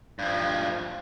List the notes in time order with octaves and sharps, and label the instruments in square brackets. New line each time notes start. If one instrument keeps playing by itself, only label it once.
[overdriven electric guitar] G2 F3